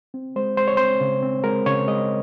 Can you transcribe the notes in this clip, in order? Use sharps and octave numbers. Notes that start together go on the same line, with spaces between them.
C4
G#3 C5
G#3 C5
C#5
C4 C5
C#3
C4
G#3 A#4
C#3 C#5
G#3 D#5